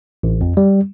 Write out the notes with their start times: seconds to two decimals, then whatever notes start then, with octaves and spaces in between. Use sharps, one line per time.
0.23 A1
0.41 F2
0.57 G3